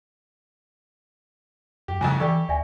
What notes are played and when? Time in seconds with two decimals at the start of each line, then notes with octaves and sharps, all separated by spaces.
1.88 F#2 G4
2.01 C2 F2 A2 C#3 G#5
2.20 E3 G4 A4 D5 C#6
2.49 D2 D5 E5 G#5